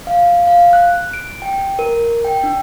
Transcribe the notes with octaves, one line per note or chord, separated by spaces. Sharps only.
F5
F5
F#6
D7
G5
A#4
G5
D4